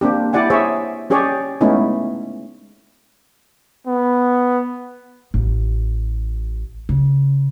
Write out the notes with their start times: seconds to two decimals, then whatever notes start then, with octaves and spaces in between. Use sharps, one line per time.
0.01 A#3 C4 D4 G4
0.33 E4 G4 D5 F#5 G#5
0.50 G#4 C5 C#5 E5
1.10 C#4 G4 G#4 C#5 D5
1.61 G#3 A3 B3 C#4 D#4 E4
3.87 B3
5.34 A1
6.89 C#3